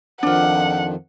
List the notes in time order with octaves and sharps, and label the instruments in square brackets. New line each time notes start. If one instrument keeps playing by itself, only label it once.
[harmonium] F2 D#3 F3 [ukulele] D4 F4 [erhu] F#5